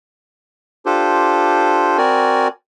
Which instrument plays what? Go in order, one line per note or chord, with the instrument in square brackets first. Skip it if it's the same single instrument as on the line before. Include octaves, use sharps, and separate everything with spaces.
[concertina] D4 F4 G4 A4 C5
C4 F#4 A#4 D5 G#5